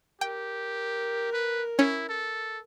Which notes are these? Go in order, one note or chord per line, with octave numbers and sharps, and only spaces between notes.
G4 A#4 G5
B4
C#4 E4
A4